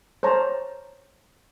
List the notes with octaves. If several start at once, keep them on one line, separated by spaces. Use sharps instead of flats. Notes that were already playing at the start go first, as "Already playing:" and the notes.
C5 C#5 A5 A#5